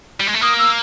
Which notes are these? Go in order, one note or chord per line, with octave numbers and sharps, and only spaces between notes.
G3
G#3
A3
A#3 D#6
E6